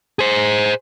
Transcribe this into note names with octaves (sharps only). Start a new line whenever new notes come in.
G#4 C5